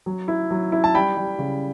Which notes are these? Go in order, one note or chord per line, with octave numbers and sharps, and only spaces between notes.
F#3
E4
F#3
E4
A5
G3 G5 B5
G3
C#3